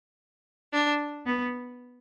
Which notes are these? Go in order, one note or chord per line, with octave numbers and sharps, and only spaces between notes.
D4
B3